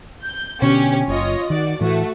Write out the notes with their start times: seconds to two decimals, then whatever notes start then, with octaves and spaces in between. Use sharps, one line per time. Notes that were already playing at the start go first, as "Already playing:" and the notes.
0.24 G6
0.62 B2 D3 C#4 G4
1.08 F#1 F4 C#5 D#5
1.50 D#3 F#4 D5
1.81 A2 E3 A3 F#4